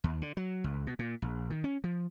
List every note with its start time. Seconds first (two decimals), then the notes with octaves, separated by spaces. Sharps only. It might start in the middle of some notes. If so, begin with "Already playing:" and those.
0.04 D#2
0.22 D3
0.37 F#3
0.64 C#2
0.87 B2
0.99 A#2
1.22 A#1
1.50 D#3
1.64 C#4
1.84 F3